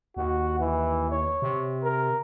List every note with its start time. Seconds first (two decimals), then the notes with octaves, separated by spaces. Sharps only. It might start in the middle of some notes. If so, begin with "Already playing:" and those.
0.17 D#2 F#4
0.60 E3
1.11 C#5
1.42 C3
1.83 A#4